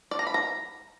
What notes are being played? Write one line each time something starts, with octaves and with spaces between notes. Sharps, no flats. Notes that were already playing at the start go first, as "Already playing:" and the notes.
D5
A#5
B5
A#5